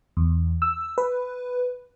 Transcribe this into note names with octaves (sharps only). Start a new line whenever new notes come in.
E2
E6
B4